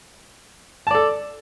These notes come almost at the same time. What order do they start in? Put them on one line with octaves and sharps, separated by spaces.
A5 D5 A4